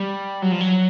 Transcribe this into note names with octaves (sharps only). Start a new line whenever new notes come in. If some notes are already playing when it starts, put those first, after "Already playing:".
Already playing: G3
F#3
F3
F#3